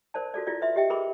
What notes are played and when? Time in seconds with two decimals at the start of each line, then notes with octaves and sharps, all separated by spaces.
0.14 A#4 C5 D5 A5
0.34 F4 F#4 A4 D5
0.47 E4 F4 D5
0.62 B4 E5 C6
0.76 G4 D#5 E5 G5
0.90 G#4 A#4 B4 B5 C#6 D6